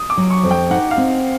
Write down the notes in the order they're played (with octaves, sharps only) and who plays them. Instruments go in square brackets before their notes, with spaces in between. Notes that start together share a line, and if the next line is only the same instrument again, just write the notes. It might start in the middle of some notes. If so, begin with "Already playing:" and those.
Already playing: [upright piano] D#6
D6
[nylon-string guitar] F#3
[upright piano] C#6
[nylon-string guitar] F2
[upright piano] G5
[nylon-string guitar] D#4 [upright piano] F#5
[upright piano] F5
[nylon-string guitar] C4